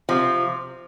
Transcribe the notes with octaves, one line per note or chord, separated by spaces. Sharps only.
C3 F3